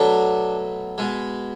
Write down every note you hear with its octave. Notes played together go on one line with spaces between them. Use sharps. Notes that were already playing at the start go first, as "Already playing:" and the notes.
Already playing: B2 F#3 A3 D4
B2 G#3